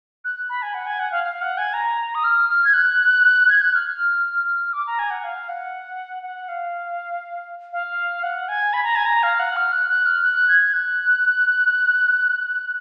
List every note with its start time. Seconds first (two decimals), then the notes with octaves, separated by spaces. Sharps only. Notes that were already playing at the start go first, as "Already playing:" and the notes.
0.25 F#6
0.49 B5
0.62 G#5
0.74 F#5
0.86 G#5
0.99 F#5
1.11 F5
1.24 F5
1.42 F#5
1.58 G#5
1.74 A#5
2.15 D#6
2.24 F6
2.49 F6
2.65 G#6
2.73 F#6
3.49 G#6
3.62 F#6
3.74 F6
4.73 D6
4.87 A#5
4.99 G#5
5.11 F#5
5.24 F5
5.49 F#5
6.23 F#5
6.48 F5
7.73 F5
8.23 F#5
8.49 G#5
8.73 B5
8.84 A#5
8.96 G#5
9.06 A#5
9.23 F5
9.39 F#5
9.56 F6
9.73 F#6
9.89 F#6
10.06 F6
10.22 F#6
10.48 G#6
10.73 F#6